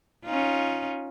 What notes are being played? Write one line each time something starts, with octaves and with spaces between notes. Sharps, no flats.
C#4 D#4 F4